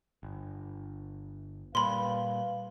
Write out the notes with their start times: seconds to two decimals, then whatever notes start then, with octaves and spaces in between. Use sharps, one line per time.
0.23 G1
1.75 A#2 G3 B4 F5 B5 C6